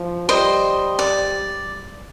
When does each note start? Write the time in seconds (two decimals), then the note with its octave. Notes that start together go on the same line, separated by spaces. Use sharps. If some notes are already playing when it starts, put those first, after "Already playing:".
Already playing: F3
0.28 G3 C5 D#5
0.99 D5